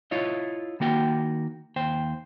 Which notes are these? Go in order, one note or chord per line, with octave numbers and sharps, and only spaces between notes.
E4 F4 C#5 D#5
D#3 A#3 F#4 G5
D#2 C5 G5